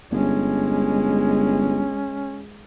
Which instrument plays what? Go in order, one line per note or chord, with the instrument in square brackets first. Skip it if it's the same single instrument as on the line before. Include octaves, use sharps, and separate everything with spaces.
[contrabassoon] G1 [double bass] G#3 [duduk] C#4